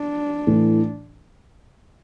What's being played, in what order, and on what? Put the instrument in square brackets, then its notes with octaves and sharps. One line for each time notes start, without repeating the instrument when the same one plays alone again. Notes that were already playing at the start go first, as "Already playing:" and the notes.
Already playing: [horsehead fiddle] D4
[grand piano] A2 E3 A3